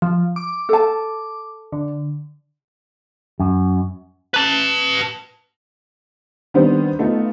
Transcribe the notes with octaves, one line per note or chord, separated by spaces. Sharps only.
F3
D6
A4 A5
D3
F#2
B4 A5
D#3 G3 B3 C4 D4 C5
A3 B3 D#4 F4